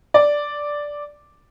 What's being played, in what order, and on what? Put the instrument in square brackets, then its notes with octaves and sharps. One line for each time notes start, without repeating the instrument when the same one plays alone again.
[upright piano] D5